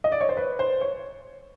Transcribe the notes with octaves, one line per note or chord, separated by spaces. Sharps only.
D#5
D5
C#5
C5
B4
C5
C#5